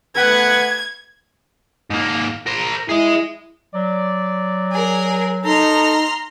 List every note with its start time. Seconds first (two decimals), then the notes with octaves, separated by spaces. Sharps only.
0.15 A3 B3 B4 F#5 G#6
1.90 G#2 A#3
2.47 A#4 C5
2.89 E4 G#4 D#5
3.75 F#3 D5
4.72 G#4 A#4
5.45 D#4 A4 A#5 C6 F6